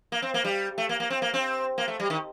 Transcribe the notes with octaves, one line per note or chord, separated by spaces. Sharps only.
A#3
C4
A#3
G3
A3
A#3
A#3
C4
A#3
C4
A#3
A3
G3
D#3